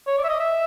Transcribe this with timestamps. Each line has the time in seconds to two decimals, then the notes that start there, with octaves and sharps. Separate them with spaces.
0.07 C#5
0.18 D5
0.24 E5
0.29 D#5
0.40 E5